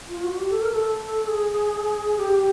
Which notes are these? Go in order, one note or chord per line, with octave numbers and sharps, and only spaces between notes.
F4
F#4
G4
A4
A#4
A4
G#4
G4
G4